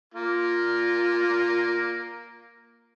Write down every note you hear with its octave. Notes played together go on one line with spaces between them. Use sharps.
A#3 F4